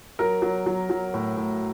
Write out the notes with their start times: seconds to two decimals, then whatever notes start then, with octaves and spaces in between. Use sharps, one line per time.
0.19 F#3 A#4
0.42 F#3
0.66 F#3
0.90 F#3
1.14 A2
1.37 A2